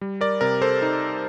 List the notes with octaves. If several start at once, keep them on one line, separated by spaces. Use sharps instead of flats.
G3
A#4 D5
C3 A#4
A4 C5
D#4